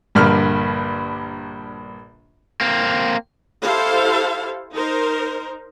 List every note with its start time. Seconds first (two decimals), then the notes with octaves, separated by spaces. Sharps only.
0.15 A#1 G2 D3 A#3 F6
2.61 A#3 C4
3.63 E4 G4 A4 C5 F5
4.74 D#4 A#4 C5